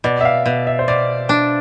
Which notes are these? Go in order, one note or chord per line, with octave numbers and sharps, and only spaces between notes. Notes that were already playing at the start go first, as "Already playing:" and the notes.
B2 D5
E5
F5
B2
E5
C5
B2 D5
D4